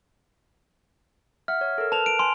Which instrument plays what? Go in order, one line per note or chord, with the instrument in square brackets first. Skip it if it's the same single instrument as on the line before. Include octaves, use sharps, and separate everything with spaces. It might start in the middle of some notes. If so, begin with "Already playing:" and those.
[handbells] E5 F#5 [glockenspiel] F6
[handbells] C#5
A4 A#4
[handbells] B4 [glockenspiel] A5 F7
[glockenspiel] D7
[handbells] G#5 [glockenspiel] C6